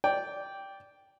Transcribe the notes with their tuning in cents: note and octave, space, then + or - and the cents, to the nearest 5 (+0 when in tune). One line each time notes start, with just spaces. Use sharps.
D5 -15 G5 +0